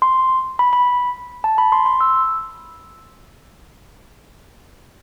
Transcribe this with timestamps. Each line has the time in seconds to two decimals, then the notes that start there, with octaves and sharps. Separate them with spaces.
0.02 C6
0.59 B5
0.73 B5
1.44 A5
1.58 B5
1.72 C6
1.86 C6
2.01 E6